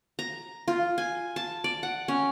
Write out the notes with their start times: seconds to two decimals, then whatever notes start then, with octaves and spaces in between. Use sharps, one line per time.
0.19 A#5
0.68 F4
0.98 G#5
1.36 A5
1.64 D5
1.83 F#5
2.08 C#4